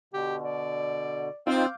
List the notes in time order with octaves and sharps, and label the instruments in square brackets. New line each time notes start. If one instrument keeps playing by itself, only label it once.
[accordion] B2 D3 [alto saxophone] G4
[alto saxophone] D5
[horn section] C4 [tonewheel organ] D#4 F4 [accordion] F5 D6 G6